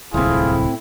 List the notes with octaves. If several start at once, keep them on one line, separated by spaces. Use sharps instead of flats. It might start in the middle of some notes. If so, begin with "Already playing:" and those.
D1 C2 A2 C4 E4 F4 G#4